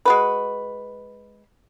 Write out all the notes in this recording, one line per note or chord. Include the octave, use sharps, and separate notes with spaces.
G#3 F#4 B4